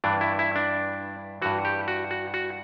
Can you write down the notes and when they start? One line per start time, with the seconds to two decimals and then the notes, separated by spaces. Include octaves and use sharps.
0.04 G2 E3 D4
0.21 E4
0.39 E4
0.56 D4
1.42 G2 E3 F#4
1.65 G4
1.88 F#4
2.11 F#4
2.34 F#4